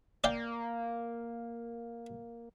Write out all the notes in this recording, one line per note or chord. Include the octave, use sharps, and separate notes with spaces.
A#3 D5 F5 G5